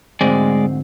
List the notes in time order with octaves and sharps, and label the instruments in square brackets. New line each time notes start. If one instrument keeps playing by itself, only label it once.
[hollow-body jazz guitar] D2 G#2 C4 [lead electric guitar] G#3 D5